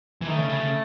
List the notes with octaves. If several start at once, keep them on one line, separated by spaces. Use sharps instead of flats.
E3
D#3 A3
C#3
C#3
C#3